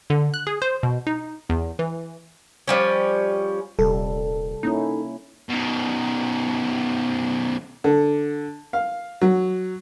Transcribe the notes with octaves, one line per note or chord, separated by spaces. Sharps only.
D3
F#6
G#4
C5
B2
D#4
E2
E3
F3 G3 C#4
D#1 C3 G3 A4
A#3 C#4 D#4 E4
B2 D#3
D3
F5
F#3